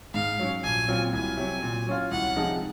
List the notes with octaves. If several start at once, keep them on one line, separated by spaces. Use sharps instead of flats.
G#2 F5
F#3 C#4
A#1 G#5
A#2 F#3 C4 F4
C2 G#5
C3 F#3
A#2
F#3 C#4 F4
C2 F#5
C3 F3 G#3 D#4